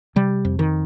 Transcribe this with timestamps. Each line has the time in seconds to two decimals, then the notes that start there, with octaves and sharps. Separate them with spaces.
0.16 C3 G3
0.45 F2
0.59 D#3